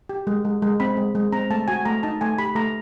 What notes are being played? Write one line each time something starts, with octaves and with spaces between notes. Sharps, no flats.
G4
G#3
G#3
G#3
C4 B5
G#3
G#3
C4 A#5
A3 A5
F#4 G#5
A3 A#5
D#4 A5
A3 G#5
G4 B5
A3 A#5